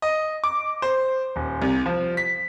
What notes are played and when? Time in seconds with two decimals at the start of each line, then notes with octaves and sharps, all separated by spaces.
0.02 D#5
0.44 D6
0.82 C5
1.36 D#1
1.62 C2
1.86 F3
2.17 B6